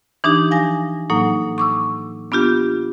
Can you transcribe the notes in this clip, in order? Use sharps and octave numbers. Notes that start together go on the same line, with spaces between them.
E3 D4 D#4 G4
F3 G#5 A#6
A2 F#3 A#3 D#4
C#6 D6 E6
B3 D4 F4 G4